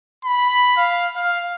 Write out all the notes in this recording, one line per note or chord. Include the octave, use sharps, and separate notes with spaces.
B5
F5
F5